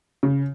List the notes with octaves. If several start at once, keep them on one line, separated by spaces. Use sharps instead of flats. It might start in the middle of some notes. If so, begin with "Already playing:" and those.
C#3